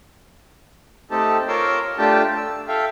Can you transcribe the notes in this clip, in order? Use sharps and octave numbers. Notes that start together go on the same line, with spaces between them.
A3 C4 D#4 G4 A4 A5
F4 A#4 C#5 C6 D6 E6
A3 D4 F4 G4 G5 A5
E6
A4 E5 F5 G5